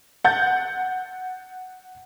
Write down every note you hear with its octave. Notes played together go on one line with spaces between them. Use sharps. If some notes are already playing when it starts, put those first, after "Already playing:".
F#5 G6 A6